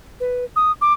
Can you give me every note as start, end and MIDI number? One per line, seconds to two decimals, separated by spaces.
0.20 0.45 71
0.56 0.72 87
0.81 0.93 86